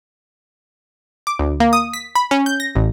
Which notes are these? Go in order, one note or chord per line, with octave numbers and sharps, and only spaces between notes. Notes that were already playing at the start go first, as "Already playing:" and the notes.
D6
D2
A#3
D#6
B6
B5
C#4
G6
A#6
A1